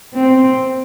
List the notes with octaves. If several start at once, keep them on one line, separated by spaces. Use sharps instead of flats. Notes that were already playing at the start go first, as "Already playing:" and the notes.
C4